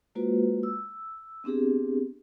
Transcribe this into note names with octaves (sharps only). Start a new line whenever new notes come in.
G#3 A#3 F4 F#4 B4 C5
E6
B3 C4 D4 G4 G#4